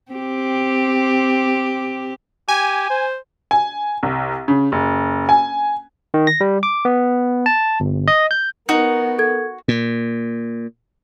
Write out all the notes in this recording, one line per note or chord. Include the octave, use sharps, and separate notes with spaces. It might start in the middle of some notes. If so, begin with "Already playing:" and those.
C4 G4
G4 G#5
C5
G#5
C2
C#3
F#1
G#5
D#3
A#6
G3
D6
B3
A5
G1
D#5
G6
B3 D#4 F#4 A#4
A4 G#6
A#2